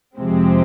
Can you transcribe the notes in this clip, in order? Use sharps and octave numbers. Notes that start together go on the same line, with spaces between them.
F2 C3 F3 G#3 C4